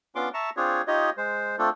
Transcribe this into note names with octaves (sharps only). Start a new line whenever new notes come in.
B3 C#4 D4 F4 C6 D6
E5 A5 A#5 C#6
C4 D4 F4 G#4 C#5
D#4 F4 G4 C#5 D#5
G#3 C5
A3 C4 D4 F4 A4